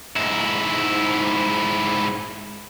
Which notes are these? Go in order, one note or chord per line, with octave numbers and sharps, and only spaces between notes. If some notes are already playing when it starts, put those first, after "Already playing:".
G#2 E4